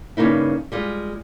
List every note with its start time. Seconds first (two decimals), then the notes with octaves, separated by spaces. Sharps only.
0.17 G2 C#3 A#3 D#4 E4
0.72 G3 G#3 F4